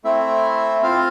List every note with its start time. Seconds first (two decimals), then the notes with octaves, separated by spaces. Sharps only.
0.04 A3 C4 E4 E5
0.82 C4 F4 F5